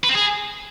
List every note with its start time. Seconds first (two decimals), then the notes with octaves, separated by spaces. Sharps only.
0.04 B4
0.09 C4
0.15 G#4